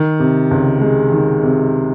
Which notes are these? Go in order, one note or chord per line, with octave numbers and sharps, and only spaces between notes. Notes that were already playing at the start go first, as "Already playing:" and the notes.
Already playing: D#3
C3
C#2
G#3
D#3
C3